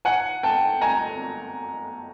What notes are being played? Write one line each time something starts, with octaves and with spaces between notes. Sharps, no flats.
F#5 G#5
G5 A5
G#5 A#5